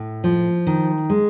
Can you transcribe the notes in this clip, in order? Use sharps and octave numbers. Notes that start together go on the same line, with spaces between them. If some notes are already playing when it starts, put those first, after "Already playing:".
Already playing: A2
F3
D#3
G#3